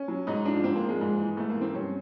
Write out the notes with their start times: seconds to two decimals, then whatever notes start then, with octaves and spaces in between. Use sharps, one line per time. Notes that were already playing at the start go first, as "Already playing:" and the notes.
Already playing: C#4
0.08 F#3
0.27 G#2 D#4
0.45 F3 D4
0.64 G#2 C4
0.76 A#3
0.82 F3
0.89 G#3
1.01 G#2
1.18 E3
1.37 G#2 A3
1.50 A#3
1.55 E3
1.61 C4
1.74 G2 C#4